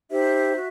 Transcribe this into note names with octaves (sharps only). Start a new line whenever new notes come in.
D#4 G4 C5 E5
F#4